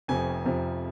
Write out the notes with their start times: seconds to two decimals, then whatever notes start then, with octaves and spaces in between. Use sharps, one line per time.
0.08 F1 F2 C3 F3 G#5
0.45 F1 F2 C3 F3